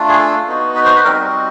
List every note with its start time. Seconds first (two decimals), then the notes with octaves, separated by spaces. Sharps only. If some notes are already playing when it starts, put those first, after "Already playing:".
Already playing: A3 D4 F4
0.09 G#4
0.18 A4
0.47 B3 D#4 F#4
0.76 B4
0.85 C5
0.96 B4
1.05 G3 C4 D#4 F#4 A#4